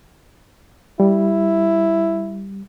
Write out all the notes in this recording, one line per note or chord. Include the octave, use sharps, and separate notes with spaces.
G3 E4